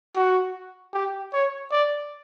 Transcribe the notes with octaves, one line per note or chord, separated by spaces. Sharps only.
F#4
G4
C#5
D5